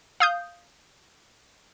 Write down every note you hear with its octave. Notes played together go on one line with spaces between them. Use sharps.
F5 D#6 G6